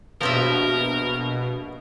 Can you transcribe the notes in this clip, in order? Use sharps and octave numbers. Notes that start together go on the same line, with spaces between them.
A#1 G2 B2 F3 A#4 C#5 D#5 E5